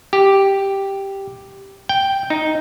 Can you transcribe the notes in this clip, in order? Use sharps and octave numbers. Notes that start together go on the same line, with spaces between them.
G4
G5
D#4